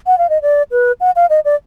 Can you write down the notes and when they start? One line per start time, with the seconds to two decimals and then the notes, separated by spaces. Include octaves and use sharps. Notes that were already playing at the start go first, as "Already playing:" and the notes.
0.07 F#5
0.18 F5
0.30 D#5
0.42 D5
0.71 B4
1.01 F#5
1.16 F5
1.30 D#5
1.45 D5